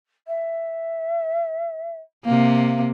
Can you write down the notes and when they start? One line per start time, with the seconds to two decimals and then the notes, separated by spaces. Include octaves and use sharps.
0.27 E5
2.25 C3 A#3 F5